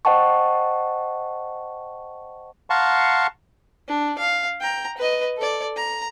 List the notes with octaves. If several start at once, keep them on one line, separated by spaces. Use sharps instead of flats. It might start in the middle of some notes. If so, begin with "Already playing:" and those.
C5 D#5 F#5 G5 A5 C#6
F5 F#5 A5 A#5 C6 C#6
D4
F5
G5 A#5
B4 D#5
A4 D5
A#5